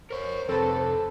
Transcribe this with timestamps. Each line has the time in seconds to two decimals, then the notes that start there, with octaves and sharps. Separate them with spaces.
0.10 A#4 C5 C#5
0.49 F2 C3 C4 A4 B4